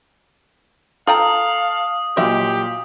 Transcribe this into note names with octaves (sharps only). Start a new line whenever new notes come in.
F4 A4 F5 G5 A#5 D#6
A#2 F#3 E4 F4 G4 D#5 E5